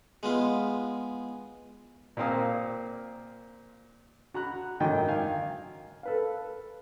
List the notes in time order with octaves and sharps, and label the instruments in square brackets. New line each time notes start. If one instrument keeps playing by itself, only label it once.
[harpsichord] G#3 B3 F4
[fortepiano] A#2 A#3 C4 F5 D#6
F#4 A#5 B5 F#6
G#1 F#2 D3 D#3 D#5 G5
F5 G#5
A4 B4 F5